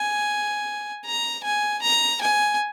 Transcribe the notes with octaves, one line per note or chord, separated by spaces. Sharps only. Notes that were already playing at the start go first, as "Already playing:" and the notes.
Already playing: G#5
A#5
G#5
A#5
G#5